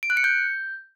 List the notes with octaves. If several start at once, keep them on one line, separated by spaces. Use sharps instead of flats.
D7
F#6
C#7
G6